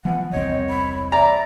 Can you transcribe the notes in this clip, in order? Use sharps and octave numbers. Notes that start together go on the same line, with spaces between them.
E3 F3 B3 F#5
E1 C2 C4 C#5 D#5
B5
D5 E5 A#5